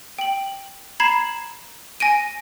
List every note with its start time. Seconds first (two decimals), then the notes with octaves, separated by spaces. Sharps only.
0.19 G5 F#7
1.00 A#5 B5 G#6 C7 E7
2.00 G#5 A#6 D7 D#7